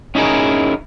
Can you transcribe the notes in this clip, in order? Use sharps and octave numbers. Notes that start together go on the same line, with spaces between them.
C#4 D#4 E4 G#4 A#4